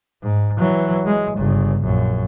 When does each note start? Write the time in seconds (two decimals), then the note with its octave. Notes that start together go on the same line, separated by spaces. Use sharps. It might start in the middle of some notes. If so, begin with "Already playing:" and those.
0.23 G#2
0.59 E3 F#3
1.06 G#3
1.37 G1 C#3
1.84 A#1 F#2